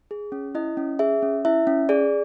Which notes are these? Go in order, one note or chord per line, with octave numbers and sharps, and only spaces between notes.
G#4
C#4
E4 D#5
C#4
G#4 E5
C#4
E4 E5
C#4
G#4 D5